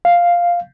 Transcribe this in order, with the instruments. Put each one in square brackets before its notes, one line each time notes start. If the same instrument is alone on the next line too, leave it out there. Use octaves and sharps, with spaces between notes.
[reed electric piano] F5